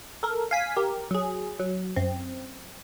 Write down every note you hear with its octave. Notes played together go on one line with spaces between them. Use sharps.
A4 A#4
F5 G#5 B6
G4 A#4
F#3 G#4
F#3
F#2 C4